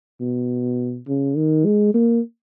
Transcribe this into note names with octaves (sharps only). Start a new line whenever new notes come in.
B2
C#3
D#3
G#3
A#3